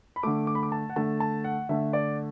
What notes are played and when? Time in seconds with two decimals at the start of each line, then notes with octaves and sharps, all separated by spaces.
0.16 B5
0.23 D3 A3 D6
0.47 D6
0.55 B5
0.63 D6
0.72 A5
0.89 F#5
0.96 D3 A3 A5
1.20 A5
1.44 F#5
1.69 D3 A3 E5
1.93 D5